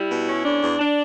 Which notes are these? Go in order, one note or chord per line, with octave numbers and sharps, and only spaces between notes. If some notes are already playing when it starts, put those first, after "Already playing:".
Already playing: G3 E4
B2
C#4
E2 D4
E2
D4